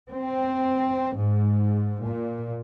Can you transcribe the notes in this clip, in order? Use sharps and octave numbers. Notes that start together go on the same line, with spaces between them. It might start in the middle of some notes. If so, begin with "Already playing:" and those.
C4
G#2
A#2